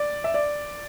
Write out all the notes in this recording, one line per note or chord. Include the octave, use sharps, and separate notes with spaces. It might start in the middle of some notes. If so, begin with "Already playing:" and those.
Already playing: D5
E5
D5